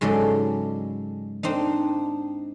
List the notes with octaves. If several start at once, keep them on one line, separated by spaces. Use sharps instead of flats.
G#2 C#3 F#3 G#3 A4 D5
C4 D4 D#4